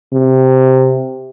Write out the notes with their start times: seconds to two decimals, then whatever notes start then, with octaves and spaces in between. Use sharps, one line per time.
0.14 C3